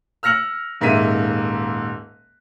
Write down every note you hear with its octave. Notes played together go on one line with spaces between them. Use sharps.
E6 F6 A#6 C#7 F#7
D#1 G#2 A#3 E5 B6 D#7